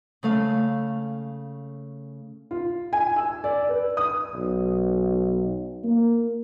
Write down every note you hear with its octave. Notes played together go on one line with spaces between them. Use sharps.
C#3 A3 F5
F4
G#5
E6
D5
B4
D#6
B1
A#3